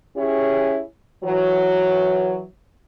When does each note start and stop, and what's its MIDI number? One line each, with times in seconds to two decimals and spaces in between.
0.16 0.81 61
0.16 0.81 64
0.16 0.81 67
0.16 0.81 68
0.16 0.81 73
1.23 2.44 52
1.23 2.44 54